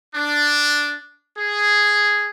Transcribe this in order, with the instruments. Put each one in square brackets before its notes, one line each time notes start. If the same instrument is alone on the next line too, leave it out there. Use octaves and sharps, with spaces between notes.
[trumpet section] D4
G#4